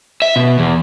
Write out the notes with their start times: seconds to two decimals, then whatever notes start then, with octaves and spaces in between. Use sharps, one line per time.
0.22 E5
0.36 B2
0.59 E2